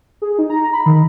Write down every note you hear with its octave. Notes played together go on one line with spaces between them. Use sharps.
G#4
D#4
A#5
B5
D#3